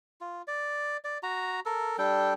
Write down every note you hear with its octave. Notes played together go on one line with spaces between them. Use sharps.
F4
D5
D5
F#4 A#5
A4 A#4
G3 D4 A4 G5